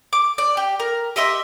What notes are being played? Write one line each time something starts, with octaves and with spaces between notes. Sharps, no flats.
D6
D5
G4
A#4
G4 D#5 E5 C6